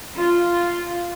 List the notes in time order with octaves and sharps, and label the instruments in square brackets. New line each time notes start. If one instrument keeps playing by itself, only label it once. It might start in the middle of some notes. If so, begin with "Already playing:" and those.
[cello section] F4